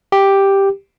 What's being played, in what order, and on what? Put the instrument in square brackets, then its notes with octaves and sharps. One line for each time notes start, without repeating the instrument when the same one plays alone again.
[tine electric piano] G4